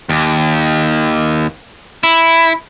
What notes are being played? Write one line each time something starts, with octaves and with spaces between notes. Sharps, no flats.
D#2
E4